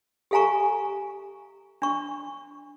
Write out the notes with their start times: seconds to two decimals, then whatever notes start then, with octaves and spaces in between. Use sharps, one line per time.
0.31 G4 A4 F5 G#5 A#5 C#6
1.82 D4 C#6